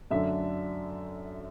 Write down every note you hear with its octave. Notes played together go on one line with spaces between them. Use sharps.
F#2 D3 A3 D4 E5